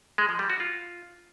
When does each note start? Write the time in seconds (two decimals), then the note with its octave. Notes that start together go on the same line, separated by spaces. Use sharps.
0.18 G#3
0.29 F3
0.39 G3
0.50 F#4
0.60 F4